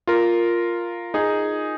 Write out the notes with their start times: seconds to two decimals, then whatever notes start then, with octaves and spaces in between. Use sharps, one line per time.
0.07 F4 A#4
1.14 D#4 G#4